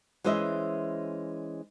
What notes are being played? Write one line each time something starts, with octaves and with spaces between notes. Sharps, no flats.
E3 G#3 C#4 C5 D#5 E5